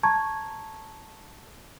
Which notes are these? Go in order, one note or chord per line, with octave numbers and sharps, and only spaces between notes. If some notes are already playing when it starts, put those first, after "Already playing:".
A5 A#5 C#6 G#6